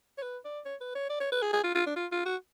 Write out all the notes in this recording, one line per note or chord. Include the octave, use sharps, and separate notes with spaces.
C#5
B4
D5
C#5
B4
C#5
D5
C#5
B4
G#4
G#4
F4
F4
D4
F4
F4
F#4